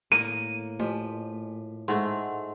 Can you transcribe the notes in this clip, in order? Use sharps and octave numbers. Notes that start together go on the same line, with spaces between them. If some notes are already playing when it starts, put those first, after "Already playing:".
A2 A#3 D#7
F3 A3
G#2 A3 F#5 C6